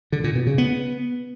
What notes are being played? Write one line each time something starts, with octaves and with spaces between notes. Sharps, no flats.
D3
A#2
B2
C#3
B3